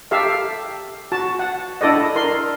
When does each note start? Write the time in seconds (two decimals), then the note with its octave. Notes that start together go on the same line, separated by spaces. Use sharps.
0.11 G4 A4 E5 F5
1.12 F#4 A5
1.39 F#5
1.81 D4 E4 A4 D5 D#5
2.16 A#4 C6